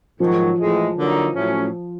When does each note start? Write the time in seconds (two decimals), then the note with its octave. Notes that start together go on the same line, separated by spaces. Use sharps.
0.20 G#2 D#3 F3 F#3
0.58 A2 E3 G#3
0.97 D3 F#3 A#3 D#4
1.35 A2 F#3 A3 C#4